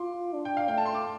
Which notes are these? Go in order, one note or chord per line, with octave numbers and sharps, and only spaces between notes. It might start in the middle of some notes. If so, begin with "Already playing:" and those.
Already playing: F4 C6 D6
D4
G5
F5
A3 G5
A5
C6
D6